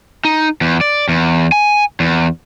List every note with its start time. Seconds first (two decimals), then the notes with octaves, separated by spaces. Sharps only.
0.25 D#4
0.61 E2
0.81 D5
1.08 E2
1.52 G#5
2.00 E2